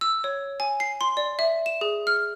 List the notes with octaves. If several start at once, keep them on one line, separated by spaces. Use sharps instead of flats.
E6
C#5
G#5
C7
C6
D5
E5
E7
G#4
F6